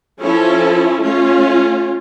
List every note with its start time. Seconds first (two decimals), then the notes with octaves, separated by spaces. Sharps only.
0.20 F3 C#4 E4 A4
1.04 A3 C#4 F4